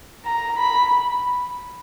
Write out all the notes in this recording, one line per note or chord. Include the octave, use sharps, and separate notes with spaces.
A#5
B5